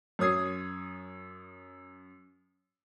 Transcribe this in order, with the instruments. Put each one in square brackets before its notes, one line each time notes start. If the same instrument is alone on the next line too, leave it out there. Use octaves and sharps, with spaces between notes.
[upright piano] F#2 C#5 D#6 G#6 C7